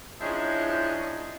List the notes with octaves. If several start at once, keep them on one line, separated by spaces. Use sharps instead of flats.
F3 F#3 G#3 C#4 D4 E4